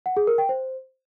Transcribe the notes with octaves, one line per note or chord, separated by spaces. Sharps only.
F#5
G#4
A#4
G5
C5